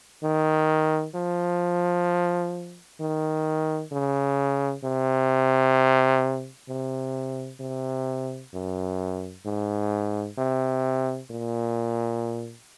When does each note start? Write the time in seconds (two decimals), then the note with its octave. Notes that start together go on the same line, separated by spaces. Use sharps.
0.23 D#3
1.15 F3
3.00 D#3
3.92 C#3
4.83 C3
6.69 C3
7.60 C3
8.53 F#2
9.45 G#2
10.38 C3
11.30 A#2